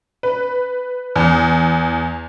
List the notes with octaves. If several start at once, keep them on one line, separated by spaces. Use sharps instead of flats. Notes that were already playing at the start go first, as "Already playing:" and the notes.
B4
E2